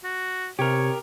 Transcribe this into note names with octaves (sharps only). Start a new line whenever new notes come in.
F#4
C3 G4 A#4 C#5